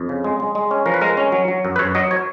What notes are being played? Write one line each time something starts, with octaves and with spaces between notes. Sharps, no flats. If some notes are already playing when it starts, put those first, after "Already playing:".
Already playing: F2
C#3
G#3
G#3
G#3
C#4
F3 A#4
B4
G#3 A#4
C#4
F#3
F#3
F#2
B4
F#2 C#5
F#3 D#5
C#5